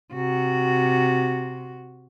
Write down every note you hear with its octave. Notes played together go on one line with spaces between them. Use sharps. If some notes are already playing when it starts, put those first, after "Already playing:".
C3 F#4